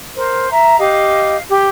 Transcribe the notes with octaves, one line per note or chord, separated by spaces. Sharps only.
A#4 C5
E5 A#5
G4 D#5 F5
G4